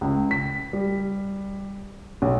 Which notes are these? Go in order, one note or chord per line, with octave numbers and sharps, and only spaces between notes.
C#2
B6
G3
B1